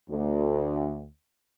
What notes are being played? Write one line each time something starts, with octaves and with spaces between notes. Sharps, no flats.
D2